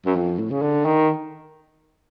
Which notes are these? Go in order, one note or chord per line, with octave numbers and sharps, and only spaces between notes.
F#2
F2
A2
C#3
D3
D#3